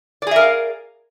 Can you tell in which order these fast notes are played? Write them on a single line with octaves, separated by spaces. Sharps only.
D5 G#4 E5 A#4 F5